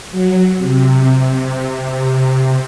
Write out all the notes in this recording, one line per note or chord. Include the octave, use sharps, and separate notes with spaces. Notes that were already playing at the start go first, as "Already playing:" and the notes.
F#3
C3